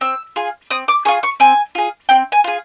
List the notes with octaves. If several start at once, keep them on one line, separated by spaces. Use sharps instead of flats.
C4 E6
F4 G#4
C4 D#6
D6
F4 G#4 C#6
C#6
C4 G#5
F4 G#4
C4 G5
G#5
F4 G#4